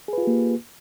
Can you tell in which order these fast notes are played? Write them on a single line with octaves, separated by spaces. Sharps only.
G#4 B4 F4 G4 A#3